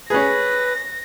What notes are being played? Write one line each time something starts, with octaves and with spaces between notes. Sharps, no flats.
C#4 G#4 B4 A#6